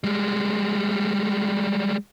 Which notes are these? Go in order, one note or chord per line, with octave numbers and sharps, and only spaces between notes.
G3 G#3